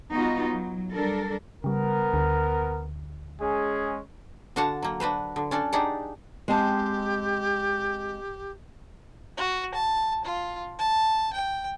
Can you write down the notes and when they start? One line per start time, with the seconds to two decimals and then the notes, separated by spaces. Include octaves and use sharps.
0.11 G3 B3 D#4 F4 F#4
0.46 F#3
0.93 G3 D4 A4 A#4
1.64 C#3 G3 B3 A#4
2.13 D2 D3
3.41 G#3 C#4 G#4
4.56 D3 D4 F#4 F5 F#5 A5
4.83 F#3 A#3
5.00 D4 F#4 B4 C5
5.36 D3
5.51 C#4 D4 A4 D5
5.73 D4 D#4 G4 G#4 D5 F#5
6.48 G#3 C4 G4 A5
9.37 F#4
9.75 A5
10.25 F4
10.79 A5
11.33 G5